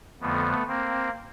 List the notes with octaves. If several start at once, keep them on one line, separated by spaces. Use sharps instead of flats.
F2 D3 F3 A3 B3
A#3 C4